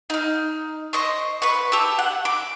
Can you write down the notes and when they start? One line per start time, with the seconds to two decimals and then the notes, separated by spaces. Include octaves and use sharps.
0.10 D#4 F6
0.93 C5 D#5 C#6
1.42 B4 C#6
1.72 G4 A5 E6
1.99 F#5
2.25 D6